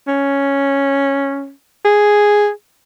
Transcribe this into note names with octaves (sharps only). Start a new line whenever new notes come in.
C#4
G#4